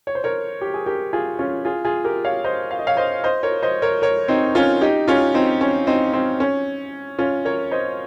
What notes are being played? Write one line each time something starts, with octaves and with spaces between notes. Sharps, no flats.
C#5
C5
A#4 C#5
G4
G#4
G4 A#4
F4 G#4
C#4 F4
F4 G#4
F4 G#4
G4 A#4
C#5 F5
C5 D#5
F5
D#5
C#5 F5
C5 D#5
C5 D#5
A#4 C#5
C5 D#5
A#4 C#5
A#4 C#5
C4 D#4
C#4 F4
D#4 G4
C#4 F4
C4 D#4
C#4
C4 D#4
C4
C#4
C#4 F4
A#4 C#5
C5 D#5